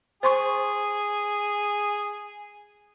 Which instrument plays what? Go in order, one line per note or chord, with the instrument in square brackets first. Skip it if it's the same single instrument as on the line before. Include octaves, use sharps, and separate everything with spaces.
[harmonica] G#4 [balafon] C5 C6 C#6